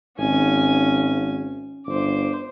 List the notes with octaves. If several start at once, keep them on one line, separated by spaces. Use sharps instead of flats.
G#1 C#4 G#5
G1 C5 D6